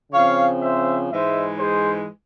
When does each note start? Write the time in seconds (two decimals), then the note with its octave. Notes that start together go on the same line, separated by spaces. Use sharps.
0.12 C#3 F3 C4 C#5 F5
0.61 C5 E5
1.09 G#2 E3 G#3 C5 E5
1.58 G#4 C5